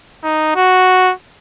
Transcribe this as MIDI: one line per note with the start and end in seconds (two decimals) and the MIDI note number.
0.24 0.54 63
0.56 1.13 66